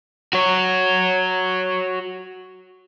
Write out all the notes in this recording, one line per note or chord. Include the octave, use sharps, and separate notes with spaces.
F#4 C#5